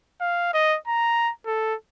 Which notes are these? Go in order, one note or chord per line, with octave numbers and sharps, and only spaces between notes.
F5
D#5
A#5
A4